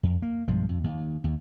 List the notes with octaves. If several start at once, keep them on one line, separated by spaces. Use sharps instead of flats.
F2
A#3
B1 G2 F3 G#3
F2
D#2
D#2